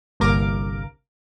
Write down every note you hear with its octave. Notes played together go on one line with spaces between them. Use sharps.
G1 C2 A#3 A#4 D6